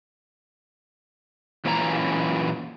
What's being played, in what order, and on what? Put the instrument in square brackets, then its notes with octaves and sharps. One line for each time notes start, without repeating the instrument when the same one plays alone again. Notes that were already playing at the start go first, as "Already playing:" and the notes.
[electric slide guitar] F#2 A#2 E3 C#4 G#5 A#5